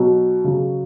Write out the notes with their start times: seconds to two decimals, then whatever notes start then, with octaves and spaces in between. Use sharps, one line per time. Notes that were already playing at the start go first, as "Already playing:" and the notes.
Already playing: B2 F#3
0.44 C#3 F#3